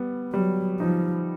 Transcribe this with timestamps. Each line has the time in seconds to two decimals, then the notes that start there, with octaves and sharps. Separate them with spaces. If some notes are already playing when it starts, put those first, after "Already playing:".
Already playing: G3 B3
0.33 F#3 G3
0.80 F3 D#4